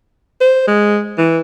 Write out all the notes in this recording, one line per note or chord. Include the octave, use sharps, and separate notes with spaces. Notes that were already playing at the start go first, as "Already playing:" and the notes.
C5
G#3
E3